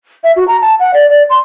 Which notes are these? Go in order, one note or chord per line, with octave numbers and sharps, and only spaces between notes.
E5
F#4
A#5
A5
F#5
D5
D5
C6